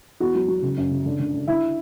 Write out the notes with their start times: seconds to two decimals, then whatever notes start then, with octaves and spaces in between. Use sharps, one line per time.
0.20 E2 F#4
0.35 F#3
0.48 F#3
0.62 C#3
0.77 F#2
0.91 C#3
1.06 D3
1.20 D3
1.34 D3
1.48 D3 E4